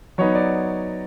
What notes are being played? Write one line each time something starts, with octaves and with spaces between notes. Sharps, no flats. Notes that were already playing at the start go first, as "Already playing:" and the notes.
F#3 B3 D#4 C#5
D5